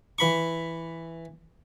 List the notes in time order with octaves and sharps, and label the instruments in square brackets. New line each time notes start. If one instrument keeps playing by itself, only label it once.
[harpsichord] E3 B5 C#6